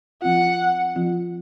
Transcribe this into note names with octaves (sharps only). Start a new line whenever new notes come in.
F3 C4 F4 F#5
F3 C4 F4